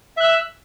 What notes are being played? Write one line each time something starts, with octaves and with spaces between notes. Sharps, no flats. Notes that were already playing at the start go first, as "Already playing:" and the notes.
E5 E6 F#6